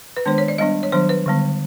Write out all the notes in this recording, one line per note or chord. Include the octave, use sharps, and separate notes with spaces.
B4
D#3 G#3 B3 D4 C5
C#5
D5
G3 B3 D4 D#5
C#5
D#3 F#3 B3 D4 C5
B4
D3 G3 B3